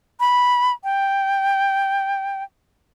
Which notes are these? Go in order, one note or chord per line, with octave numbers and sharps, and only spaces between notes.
B5
G5